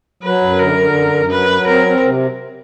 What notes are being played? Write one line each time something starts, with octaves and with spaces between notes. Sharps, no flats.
F#3 B4
F#2
D3 A#4
D3
F#2
F#2
F#3 B4
F#3
C4 A#4
C4
C3